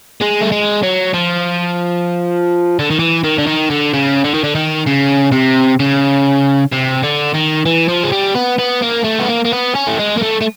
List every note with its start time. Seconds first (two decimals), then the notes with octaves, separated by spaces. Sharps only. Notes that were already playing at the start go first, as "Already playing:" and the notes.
0.21 G#3
0.41 A3
0.52 G#3
0.83 F#3
1.13 F3
2.79 D3
2.90 D#3
2.99 E3
3.24 D#3
3.38 D3
3.46 D#3
3.70 D3
3.94 C#3
4.24 D3
4.34 D#3
4.43 D3
4.55 D#3
4.87 C#3
5.32 C3
5.80 C#3
6.72 C3
7.03 D3
7.34 D#3
7.66 E3
7.89 F3
8.04 G#3
8.12 G3
8.35 B3
8.59 B3
8.82 A#3
9.05 A3
9.20 B3
9.29 A#3
9.45 A#3
9.52 B3
9.75 C#4
9.87 A3
9.99 G#3
10.17 A#3
10.21 A3
10.41 A3